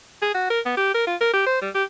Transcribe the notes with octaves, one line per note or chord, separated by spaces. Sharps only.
G#4
F#4
A#4
B3
G4
A#4
F4
A#4
G4
C5
G3
G4